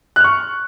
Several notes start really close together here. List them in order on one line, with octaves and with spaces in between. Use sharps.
F#6 F6 C#6